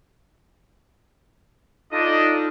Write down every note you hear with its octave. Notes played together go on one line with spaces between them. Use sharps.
D4 D#4 F4 A4 D#5